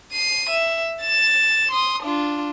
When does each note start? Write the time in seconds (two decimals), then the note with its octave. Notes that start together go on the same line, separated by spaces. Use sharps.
0.12 C7 D#7
0.50 E5
1.03 A6 E7
1.71 C6 D#6
2.03 D4 F4